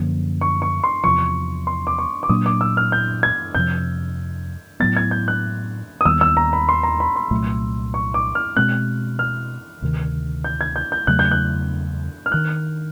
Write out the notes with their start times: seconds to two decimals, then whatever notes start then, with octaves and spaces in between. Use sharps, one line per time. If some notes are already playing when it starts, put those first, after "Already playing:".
Already playing: F#2 D3 F3 A#3
0.41 C#6
0.62 C#6
0.84 C6
1.04 E2 C3 F3 C#6
1.67 C6
1.87 D6
1.98 C#6
2.23 D6
2.29 A#2 F#3 A#3 D4 D#6
2.46 D6
2.61 E6
2.77 F6
2.92 G6
3.23 G#6
3.55 F2 C3 F3 G6
4.80 A2 F#3 B3 A6
4.97 G#6
5.11 G6
5.28 F#6
6.01 D#6
6.05 D#2 D#3 G3 B3 E6
6.21 E6
6.37 A#5
6.53 B5
6.69 C6
6.83 A#5
7.00 B5
7.16 C6
7.31 C2 A#2 F#3 A3
7.94 C#6
8.14 D6
8.35 F6
8.57 B2 G#3 C4 F#6
9.19 F6
9.82 D2 C3 D#3
10.44 G6
10.61 G#6
10.76 G6
10.92 G6
11.07 E2 C#3 F#3 A3 F#6
11.19 G6
11.31 F#6
12.26 F6
12.32 D#3 F#6